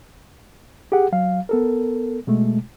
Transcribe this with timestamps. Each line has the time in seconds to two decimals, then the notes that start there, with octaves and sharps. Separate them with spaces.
0.92 G4 G#4 F#5
1.12 F#3 F5
1.49 B3 A4 A#4
2.27 B2 G#3 A3